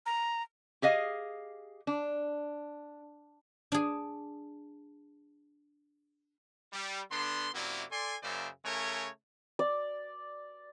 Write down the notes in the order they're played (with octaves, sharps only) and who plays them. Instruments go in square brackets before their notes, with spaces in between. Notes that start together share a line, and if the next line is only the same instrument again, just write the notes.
[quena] A#5
[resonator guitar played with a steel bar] G4 G#4 D#5 F5
D4
[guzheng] D4 G#4
[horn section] G3
D3 B3 D4 C6
F#2 C3 F#3 A#3 E4 D5
A4 D5 G#5 C6
F#2 C#3 A#3 C5 D5 E5
C#3 A3 A#4 C#5 G#5
[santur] D5